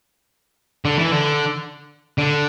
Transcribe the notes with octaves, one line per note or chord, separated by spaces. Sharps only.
D3
E3
D3
D3